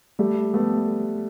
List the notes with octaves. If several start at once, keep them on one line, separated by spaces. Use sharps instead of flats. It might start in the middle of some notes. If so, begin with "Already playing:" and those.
G3 A3
A3 B3